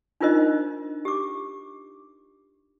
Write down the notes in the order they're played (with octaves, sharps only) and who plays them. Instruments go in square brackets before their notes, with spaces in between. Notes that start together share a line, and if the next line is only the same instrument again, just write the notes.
[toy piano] D4 D#4 F4 A#4 C5 D#5
G4 D6